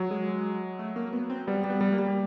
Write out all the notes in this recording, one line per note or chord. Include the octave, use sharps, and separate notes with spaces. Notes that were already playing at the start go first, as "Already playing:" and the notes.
Already playing: F#3
G#3
A3
A#3
B3
C4
G3 B3
G3
B3
G3
A#3
G3